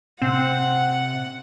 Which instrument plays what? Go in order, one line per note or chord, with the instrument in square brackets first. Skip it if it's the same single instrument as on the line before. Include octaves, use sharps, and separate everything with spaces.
[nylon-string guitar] C3 [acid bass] C4 [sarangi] F#5